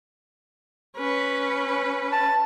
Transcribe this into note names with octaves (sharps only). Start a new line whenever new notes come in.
C#4 B4
A5